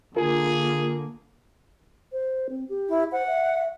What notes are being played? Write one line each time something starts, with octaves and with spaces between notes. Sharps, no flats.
D3 A#3 F4 G#4 A#4
C5
C4
G4
E4
C5 F#5
E5